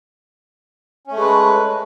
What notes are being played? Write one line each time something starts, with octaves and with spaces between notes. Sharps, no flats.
G#3 A3 C#4 B4